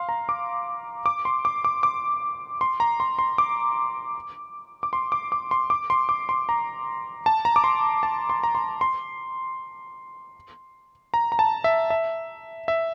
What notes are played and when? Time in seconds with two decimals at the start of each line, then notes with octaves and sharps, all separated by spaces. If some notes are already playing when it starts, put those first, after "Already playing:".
Already playing: F5 C6
0.09 A#5
0.29 D6
1.06 D6
1.25 C6
1.45 D6
1.65 D6
1.83 D6
2.61 C6
2.80 A#5
3.00 C6
3.19 C6
3.38 D6
4.83 D6
4.93 C6
5.12 D6
5.32 D6
5.51 C6
5.70 D6
5.90 C6
6.09 D6
6.29 C6
6.49 A#5
7.26 A5
7.45 A#5
7.56 D6
7.64 C6
8.03 A5
8.30 C6
8.44 A#5
8.55 C6
8.81 C6
11.14 A#5
11.32 A#5
11.39 A5
11.64 E5
11.90 E5
12.68 E5